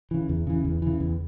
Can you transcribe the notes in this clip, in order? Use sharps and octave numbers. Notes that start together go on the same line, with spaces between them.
C#3 E3
E2
C#3 E3
E2
C#3 E3
E2